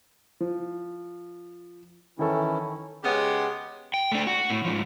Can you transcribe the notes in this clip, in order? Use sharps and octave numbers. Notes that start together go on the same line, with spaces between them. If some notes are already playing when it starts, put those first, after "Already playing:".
F3
D#3 E3 C#4 E4 A4
C#3 G#3 B3 C#4 G4
G5
A3 D4
F#4
A2
G#2 F3